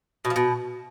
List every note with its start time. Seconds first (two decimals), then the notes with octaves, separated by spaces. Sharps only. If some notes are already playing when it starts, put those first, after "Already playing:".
0.25 B2
0.30 F3
0.36 B2